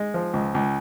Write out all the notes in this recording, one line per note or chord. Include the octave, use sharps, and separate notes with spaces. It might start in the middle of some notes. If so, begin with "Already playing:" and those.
Already playing: G#3
F3
C#2
C#2